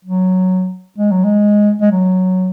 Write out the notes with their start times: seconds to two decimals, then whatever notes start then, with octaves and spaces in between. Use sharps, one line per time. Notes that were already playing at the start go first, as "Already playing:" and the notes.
0.05 F#3
0.98 G#3
1.11 F#3
1.24 G#3
1.81 G#3
1.92 F#3